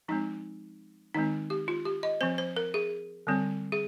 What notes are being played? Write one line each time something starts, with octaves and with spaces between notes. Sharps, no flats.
F3 G#3 C4 D#4
D#3 G#3 C4 D#4
G4
F4
G4
D#5
F3 C4 C5
C5
A#4
G#4
D3 G3 C4
G#4